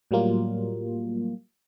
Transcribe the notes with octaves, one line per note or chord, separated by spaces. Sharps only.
A2 F#3 G3 A#3 F4